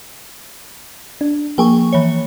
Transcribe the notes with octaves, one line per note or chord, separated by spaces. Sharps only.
D4
F3 A#3 G#4 G5 G#5 C#6
E3 C#5